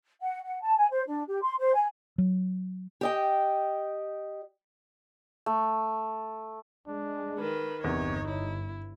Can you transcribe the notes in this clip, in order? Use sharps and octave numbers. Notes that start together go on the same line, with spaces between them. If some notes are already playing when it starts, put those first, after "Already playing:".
F#5
F#5
A5
G#5
C5
D4
G4
C6
C5
G#5
F#3
G4 D#5 G5
A3
G#3 D4
D#3 B4
G1 E2 C3 D#4 C#5
E4 C#5